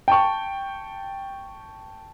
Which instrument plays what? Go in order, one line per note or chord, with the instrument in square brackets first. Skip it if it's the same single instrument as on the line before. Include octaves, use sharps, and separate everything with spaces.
[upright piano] G5 A5 C#6